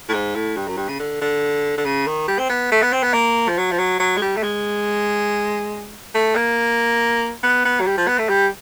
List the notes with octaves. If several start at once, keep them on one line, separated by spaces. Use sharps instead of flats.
A2
G#2
A2
G2
F#2
G2
C#3
D3
D3
D3
C#3
D#3
G3
C4
B3
A3
B3
C4
B3
A#3
F3
F#3
F3
F#3
F#3
G#3
G3
A3
G#3
A3
A#3
B3
B3
F#3
G3
F3
B3
A3
G3